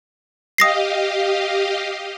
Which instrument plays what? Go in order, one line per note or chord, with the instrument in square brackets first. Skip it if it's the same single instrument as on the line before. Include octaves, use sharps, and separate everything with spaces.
[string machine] G4 D#5 F5 [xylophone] D#6 A#6 C7